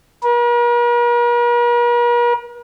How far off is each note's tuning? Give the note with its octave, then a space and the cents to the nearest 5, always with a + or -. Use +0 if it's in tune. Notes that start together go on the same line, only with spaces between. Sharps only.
A#4 +45